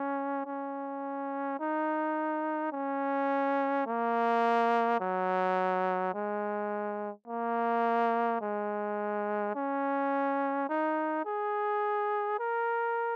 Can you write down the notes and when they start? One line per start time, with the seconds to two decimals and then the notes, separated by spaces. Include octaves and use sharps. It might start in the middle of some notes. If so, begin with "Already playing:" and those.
Already playing: C#4
0.46 C#4
1.60 D#4
2.73 C#4
3.87 A#3
5.00 F#3
6.14 G#3
7.28 A#3
8.41 G#3
9.55 C#4
10.69 D#4
11.25 G#4
12.39 A#4